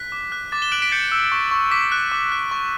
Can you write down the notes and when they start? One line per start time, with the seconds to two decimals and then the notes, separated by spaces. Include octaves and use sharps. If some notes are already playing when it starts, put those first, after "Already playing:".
Already playing: F#6 B6
0.12 D6
0.32 F#6
0.52 D6 A6
0.62 E7 G7
0.72 F#6 D7 F#7
0.82 B6 D7
0.92 G6 A6 C#7
1.12 E6
1.32 C#6
1.51 C#6
1.71 D6 B6
1.92 F#6
2.12 D6
2.32 F#6
2.51 C#6